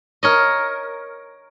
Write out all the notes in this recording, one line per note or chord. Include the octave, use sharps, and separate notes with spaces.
A#4 C#5 D#5